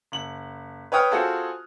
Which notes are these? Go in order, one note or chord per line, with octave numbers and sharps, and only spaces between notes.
F#1 F#7
B4 C#5 G5 D#6 F6
C4 F4 F#4 G#4 A4